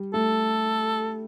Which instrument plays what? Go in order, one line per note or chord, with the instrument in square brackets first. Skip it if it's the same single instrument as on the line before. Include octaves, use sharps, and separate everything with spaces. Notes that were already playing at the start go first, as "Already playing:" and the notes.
Already playing: [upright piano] G3
[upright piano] A3 [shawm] A4